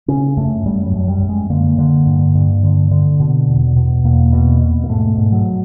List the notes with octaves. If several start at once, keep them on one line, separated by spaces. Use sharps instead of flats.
C#3 C#4
F#2 A3
F#2 G3
F#3
F#2
G3
F#2
G#3
D3 A#3
D3
G2
G2
D3
D3
B2
E2
B2
E2 A#3
B2
B2
A#3
G#2 A3
G#2
F#3